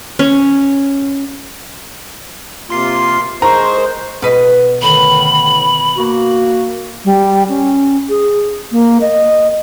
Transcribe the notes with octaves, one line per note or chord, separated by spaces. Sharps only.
C#4
C3 A#3 F4 C6 C7
G#3 A#4 C5 A#5 C#6
B2 B4 D#5
A2 D3 D#3 B5
A#3 F#4
G3
C#4
G#4
A#3
D#5